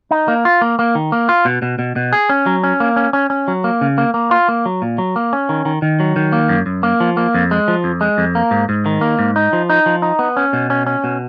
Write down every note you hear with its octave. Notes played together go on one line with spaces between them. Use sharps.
D#4
A#3
F4
A#3
A#3
D#3
A#3
F4
B2
B2
B2
B2
G#4
C#4
F#3
C#4
A#3
C#4
C#4
C#4
F#3
A#3
C#3
A#3
A#3
F4
A#3
F#3
A#2
F#3
A#3
C#4
D#3
D#3
D#3
F#3
D#3
A#3
F#2
F#2
A#3
F3
A#3
F2
G#3
F3
F2
G#3
F2
A#3
G#2
G#2
D#3
A#3
G#2
D#4
F3
D#4
F3
D#4
B3
C#4
B2
C#4
C#4
B2